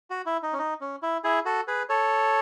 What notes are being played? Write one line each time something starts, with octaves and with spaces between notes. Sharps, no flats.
F#4
E4
D#4
C#4
D#4
C#4
E4
E4 G#4
F#4 A4
G#4 B4
A4 C#5